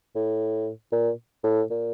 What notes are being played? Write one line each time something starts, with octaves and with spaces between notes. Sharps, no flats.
A2
A#2
A2
A#2